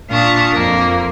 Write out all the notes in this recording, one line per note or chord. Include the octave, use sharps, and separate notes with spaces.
A#2 D4 F5 A5 C#6 D#6
F2 A#3